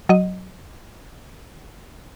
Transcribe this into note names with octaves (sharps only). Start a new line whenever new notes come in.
F#3 D#5